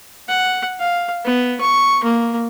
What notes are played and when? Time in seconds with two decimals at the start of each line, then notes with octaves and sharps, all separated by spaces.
0.28 F#5
0.79 F5
1.25 B3
1.60 C#6
2.03 A#3